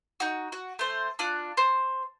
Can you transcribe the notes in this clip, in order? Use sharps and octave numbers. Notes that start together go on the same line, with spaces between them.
D#4 F#4
F#4
A3 C5
D4 F4 F#6
C5